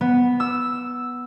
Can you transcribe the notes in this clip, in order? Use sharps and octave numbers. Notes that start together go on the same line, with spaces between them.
B3
E6